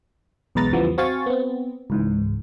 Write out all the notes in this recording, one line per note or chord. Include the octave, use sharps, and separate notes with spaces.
B1 E2 G#3 B4 A#5 A6
E2 C#3 E3 F3 G3 B3
C4 F#4 F5 G#5 C#6 A6
B3 C4
C#2 G#2 E3